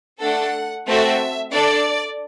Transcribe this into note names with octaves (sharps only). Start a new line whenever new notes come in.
A3 D4 A4 F#5
A3 C4 F#4 A4 E5
D4 A4 D5